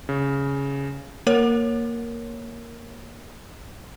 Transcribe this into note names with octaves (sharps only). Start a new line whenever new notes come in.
C#3
A#3 A#4 C#5